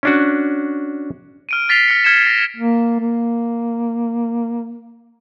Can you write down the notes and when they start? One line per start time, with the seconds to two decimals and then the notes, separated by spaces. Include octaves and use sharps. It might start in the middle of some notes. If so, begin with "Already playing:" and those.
0.03 C#4 D4 F#4
1.49 F6 D7 D#7
1.69 F6 A6 B6 C7 F7 G7
1.88 F6 A#6 B6 C#7
2.04 F6 G#6 B6 C#7 E7
2.27 A#6
2.56 A#3
3.00 A#3